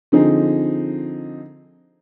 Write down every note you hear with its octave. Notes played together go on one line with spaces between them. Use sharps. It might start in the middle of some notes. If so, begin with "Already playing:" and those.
D3 F3 C4 D#4 G#4